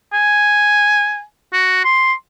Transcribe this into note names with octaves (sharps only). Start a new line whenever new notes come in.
G#5
F#4
C6